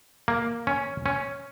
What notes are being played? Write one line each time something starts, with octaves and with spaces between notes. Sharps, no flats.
A#3
C#4
C#4